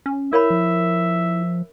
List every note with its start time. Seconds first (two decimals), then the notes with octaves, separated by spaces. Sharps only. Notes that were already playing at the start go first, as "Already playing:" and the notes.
0.06 C#4
0.33 E4 A#4 C#5 E5 B5
0.50 F3